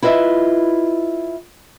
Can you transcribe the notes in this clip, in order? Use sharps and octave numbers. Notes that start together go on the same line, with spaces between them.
E4 F4 B4 D#5 E5